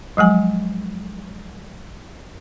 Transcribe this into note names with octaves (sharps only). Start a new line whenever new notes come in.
F3 F#3 G#3 G#5